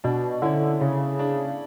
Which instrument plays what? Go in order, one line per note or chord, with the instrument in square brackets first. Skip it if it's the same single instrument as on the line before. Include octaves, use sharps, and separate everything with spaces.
[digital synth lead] B2 [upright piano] D4
[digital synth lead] D3 [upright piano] C#4 E4
[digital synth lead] C#3 [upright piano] C#4
[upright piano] D4